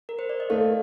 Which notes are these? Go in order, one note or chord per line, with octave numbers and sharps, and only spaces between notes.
A#4
C5
D5
D#5
A3 F5